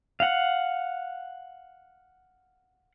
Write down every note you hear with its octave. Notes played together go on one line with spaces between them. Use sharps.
F5 F#5